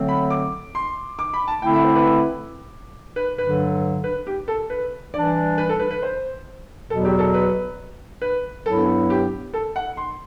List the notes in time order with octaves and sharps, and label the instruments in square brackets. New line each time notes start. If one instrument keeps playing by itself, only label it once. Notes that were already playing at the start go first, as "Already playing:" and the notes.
Already playing: [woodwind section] D3 F#3 A3 C4
[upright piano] B5
D6
C6
D6
B5
A5
[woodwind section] D3 A3 C4 E4 [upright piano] G5
[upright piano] E5
C5
B4
B4
[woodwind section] G2 D3 F#3 [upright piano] B4
[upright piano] B4
G4
A4
B4
[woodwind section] E3 G3 D4 [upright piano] D5
[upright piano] B4
A4
B4
B4
C5
[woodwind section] E2 B2 F#3 [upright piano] A4
[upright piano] G4
A4
B4
B4
[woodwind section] G2 F#3 B3 E4 [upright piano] A4
[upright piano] G4
A4
F#5
C6